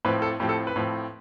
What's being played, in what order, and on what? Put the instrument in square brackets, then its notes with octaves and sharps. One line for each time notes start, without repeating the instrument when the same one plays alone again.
[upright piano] A2 F3 C4 B4
A4
A2 F3 C4 G4
A4
B4
A2 F3 C4